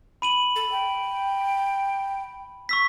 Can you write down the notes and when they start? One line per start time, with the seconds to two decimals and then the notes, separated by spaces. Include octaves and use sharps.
0.22 B5 D#7 F#7
0.56 A4
0.72 G5
2.69 C#6 E6 B6